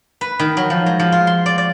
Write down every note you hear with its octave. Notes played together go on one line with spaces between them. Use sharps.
B4
D#3
F#3
F3
G#3
F3
F4
C6
D5
D5